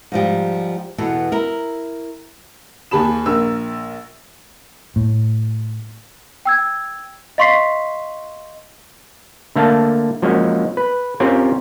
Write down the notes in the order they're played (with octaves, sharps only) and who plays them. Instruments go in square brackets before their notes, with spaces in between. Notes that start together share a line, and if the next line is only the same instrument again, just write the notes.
[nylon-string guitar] G#2 F3 G3
E2 B2 B3 A4
E4 A#4
[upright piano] D#2 G#4 A5 B5 E7
A#1 A#4 E6
[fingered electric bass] A2
[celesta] G5 E6 G#6
D#5 F5 C6 C#6 B6 C7
[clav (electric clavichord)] D3 A3 A#3 F5 A5
F3 F#3 G#3 A#3 C#4
B4
C4 C#4 F4 G4 A#4 C#5